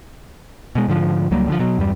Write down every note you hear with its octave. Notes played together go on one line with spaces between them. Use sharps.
B2 G#3
G#2 D3 F3
C#2 F#3 G3 A#3
D3 E3 F3
B2 F#3
E2 G2 G3